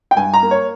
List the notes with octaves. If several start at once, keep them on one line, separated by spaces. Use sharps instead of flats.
G5
G2 G#5
A#5
A#3
C#5